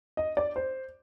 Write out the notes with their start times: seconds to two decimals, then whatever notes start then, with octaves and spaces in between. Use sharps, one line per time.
0.17 D#5
0.37 D5
0.56 C5